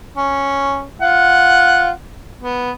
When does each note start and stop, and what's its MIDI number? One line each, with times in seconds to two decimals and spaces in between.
0.17 0.84 61
1.01 1.90 65
1.01 1.90 78
2.41 2.71 59